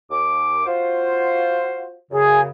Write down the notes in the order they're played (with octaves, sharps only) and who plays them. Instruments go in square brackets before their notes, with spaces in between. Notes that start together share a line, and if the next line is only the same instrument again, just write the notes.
[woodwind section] D#2 D6
F4 F#4 C5
[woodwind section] F#2 C#3 [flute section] G#4